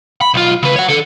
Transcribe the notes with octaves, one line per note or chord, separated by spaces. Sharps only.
B5
B1 F4
C#3 B4
C#5 F#5
D3 A4